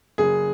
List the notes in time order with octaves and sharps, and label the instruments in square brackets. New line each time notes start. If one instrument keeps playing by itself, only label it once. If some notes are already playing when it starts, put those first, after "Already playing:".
[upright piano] F#1 [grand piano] G#4